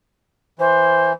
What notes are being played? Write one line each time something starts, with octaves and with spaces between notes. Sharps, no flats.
E3 C5